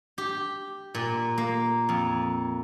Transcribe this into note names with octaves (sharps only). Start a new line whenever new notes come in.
G4
A#2
A#3
F2